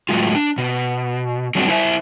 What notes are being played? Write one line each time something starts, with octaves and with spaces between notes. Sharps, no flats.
A2 F#3 G#3 F4
D4
B2
F#3 G3 C4 D4 F#4
E4 C5 E5